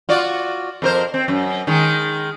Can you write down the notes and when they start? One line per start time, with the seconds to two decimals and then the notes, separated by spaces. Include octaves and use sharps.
0.09 F4 F#4 D5
0.82 F2 A#4 C5
1.14 C4
1.28 F#2
1.67 D#3 G#3